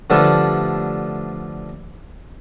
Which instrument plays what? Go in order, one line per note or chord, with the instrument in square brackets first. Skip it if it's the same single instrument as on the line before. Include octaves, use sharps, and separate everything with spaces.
[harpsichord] D3 F3 G3 A3 B3 D4